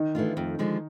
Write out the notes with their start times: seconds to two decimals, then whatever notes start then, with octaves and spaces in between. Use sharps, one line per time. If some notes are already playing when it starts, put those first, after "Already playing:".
Already playing: D#3 D#4
0.15 E3 A3 D4 F4
0.37 F2
0.59 D3 F3 G#3